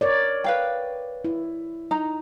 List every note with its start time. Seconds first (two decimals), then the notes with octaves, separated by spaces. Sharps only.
0.01 A#4 C#5 D5
0.44 B4 F5 G5
1.25 E4
1.91 D#4 A#5